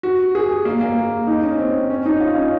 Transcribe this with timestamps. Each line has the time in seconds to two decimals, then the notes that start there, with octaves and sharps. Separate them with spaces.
0.03 F#4
0.35 G#4
0.65 A#3
0.81 A#3
1.27 D#4
1.43 C#4
1.58 C4
1.90 C#4
2.06 D#4
2.20 F4
2.36 C#4